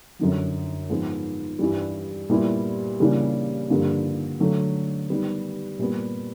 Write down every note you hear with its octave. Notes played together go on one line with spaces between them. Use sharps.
F#2 D3 F#3
G#2 F3 G#3 B3
G2 E3 G3
A#2 G3 B3 E4
C#3 E3 G3 A#3 D4
G2 D3 F3 A#3
D3 F#3 A3
D#3 G3 B3
A#2 G3 B3